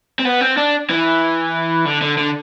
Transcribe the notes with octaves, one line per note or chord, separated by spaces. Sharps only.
C4
B3
C4
D4
E3
D3
D3
D3